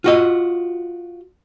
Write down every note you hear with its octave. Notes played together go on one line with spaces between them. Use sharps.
F4 F#4 D#5